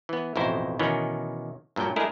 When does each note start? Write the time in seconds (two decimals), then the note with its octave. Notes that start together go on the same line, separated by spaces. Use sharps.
0.09 E3 B3
0.36 A1 F2 B2 D#4 E4 C5
0.79 B2 D#3 E3 B3 C#4
1.76 G2 A#2 F#3 G5
1.96 G#3 A3 D4 E4 G#4 A#4